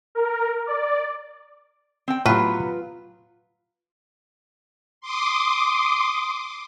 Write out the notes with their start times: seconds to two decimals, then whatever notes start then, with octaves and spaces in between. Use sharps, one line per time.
0.15 A#4
0.67 D5
2.08 C4 G5
2.26 A2 F#3 B3 F4 B4
5.01 C6 D6 D#6